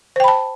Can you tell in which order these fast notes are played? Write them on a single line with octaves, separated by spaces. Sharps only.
C5 G5 B5 A5